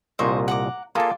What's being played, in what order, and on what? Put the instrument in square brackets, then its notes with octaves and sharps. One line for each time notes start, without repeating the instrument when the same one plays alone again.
[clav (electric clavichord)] C2 A#2 D#5 [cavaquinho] C5 C#6
[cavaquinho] F#5 A#5 D6
[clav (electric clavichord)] A#3 G#4 A4 [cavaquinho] F4 D5